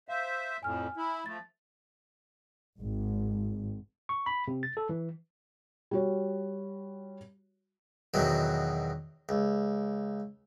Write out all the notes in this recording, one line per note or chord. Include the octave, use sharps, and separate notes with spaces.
C5 E5 F5
F2 A2 G#5 F6
E4
F3 A3 A6
G#1
C#6
B5
C3
A6
A4
E3
G3 F#4 C#5
E2 B2 D#3 F#3
C#2